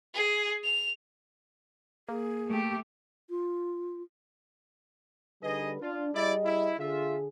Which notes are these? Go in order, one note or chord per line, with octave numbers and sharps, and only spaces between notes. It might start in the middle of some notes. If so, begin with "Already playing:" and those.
G#4
F7
A#3 G#4
A3 G4
F4
D3 G3 D#4 G#4 B4 D#5
D4 F4
G3 E4 G#4 D5 D#5
E4
D3 F4 G#4 E5